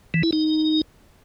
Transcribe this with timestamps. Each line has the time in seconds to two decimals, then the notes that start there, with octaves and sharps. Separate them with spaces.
0.14 E3
0.23 E4
0.33 D#4